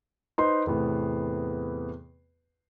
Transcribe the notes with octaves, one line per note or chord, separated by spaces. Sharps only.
D#4 B4 C5 C6
E2 A2 C3 B3